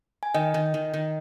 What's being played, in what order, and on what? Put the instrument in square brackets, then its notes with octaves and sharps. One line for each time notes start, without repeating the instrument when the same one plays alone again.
[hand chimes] G#5
[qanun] D#3 [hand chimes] D#5 G5
[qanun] D#3
D#3
D#3